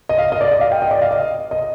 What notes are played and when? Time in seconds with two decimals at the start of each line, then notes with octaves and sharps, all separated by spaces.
0.09 D#5
0.18 F5
0.32 D#5
0.41 D5
0.51 D#5
0.61 F5
0.72 G5
0.82 D#5
0.91 D5
1.01 F5
1.11 D#5
1.51 D#5